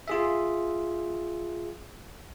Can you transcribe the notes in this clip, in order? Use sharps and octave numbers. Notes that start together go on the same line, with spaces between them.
F4 G#4 E5